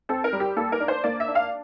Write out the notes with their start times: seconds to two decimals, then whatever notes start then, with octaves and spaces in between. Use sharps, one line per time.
0.09 C4 A4
0.24 A#4
0.33 G3
0.40 G4
0.57 A#3 A4
0.72 A#4
0.80 D4
0.88 C5
1.04 A#3 D5
1.20 E5
1.28 D4
1.35 F5